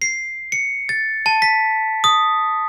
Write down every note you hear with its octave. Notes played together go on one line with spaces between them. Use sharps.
C7
C#7
A6
A5
B6
D#6